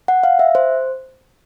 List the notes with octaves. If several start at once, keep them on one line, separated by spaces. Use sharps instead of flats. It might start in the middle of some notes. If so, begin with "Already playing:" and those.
F#5
F5
E5
C5